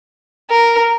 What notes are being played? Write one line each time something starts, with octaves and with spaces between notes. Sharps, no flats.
A#4